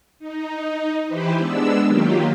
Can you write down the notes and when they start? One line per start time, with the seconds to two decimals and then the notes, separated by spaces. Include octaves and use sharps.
0.19 D#4
1.08 E3 E4 G4 B4 C5
1.37 G#3 B3 D4 E6
1.86 D#3 F#3 A#3 F4 G4